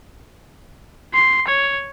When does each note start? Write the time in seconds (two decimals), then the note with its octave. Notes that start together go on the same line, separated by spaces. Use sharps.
1.14 C6
1.48 C#5